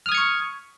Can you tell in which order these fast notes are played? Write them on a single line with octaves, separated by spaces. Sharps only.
F6 D#6 G#6 C#7 C#6